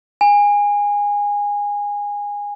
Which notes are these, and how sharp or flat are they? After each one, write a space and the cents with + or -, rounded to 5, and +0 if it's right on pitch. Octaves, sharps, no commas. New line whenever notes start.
G#5 -20